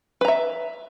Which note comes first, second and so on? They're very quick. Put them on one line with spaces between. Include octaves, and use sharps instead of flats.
B4 A#5 E5